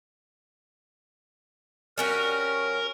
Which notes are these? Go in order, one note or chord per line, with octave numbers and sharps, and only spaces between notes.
G3 C#4 F#4 A#4